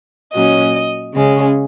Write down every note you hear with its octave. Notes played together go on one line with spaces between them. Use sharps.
A#2 F#3 C#4 D#5
C#3 G#3 C#4